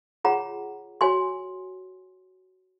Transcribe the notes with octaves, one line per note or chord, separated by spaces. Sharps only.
F4 G#4 C#5 F#5 A#5
F#4 C#5 G#5 C6